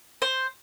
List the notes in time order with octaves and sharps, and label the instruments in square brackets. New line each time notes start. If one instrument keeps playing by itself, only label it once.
[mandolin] C5